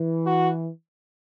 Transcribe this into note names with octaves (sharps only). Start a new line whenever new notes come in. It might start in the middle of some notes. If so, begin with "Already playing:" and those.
Already playing: E3
F#4